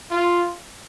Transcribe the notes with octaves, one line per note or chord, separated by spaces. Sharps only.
F4